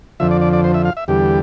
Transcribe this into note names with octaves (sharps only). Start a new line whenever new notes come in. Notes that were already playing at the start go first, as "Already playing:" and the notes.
F2 D3 F3 E5
D5
D5
D5
C5
E5
F5
E5
E2 D3 G3 G4